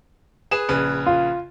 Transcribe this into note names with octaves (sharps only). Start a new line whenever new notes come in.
G#4 B4 E7
A#1 C#3 B4
F4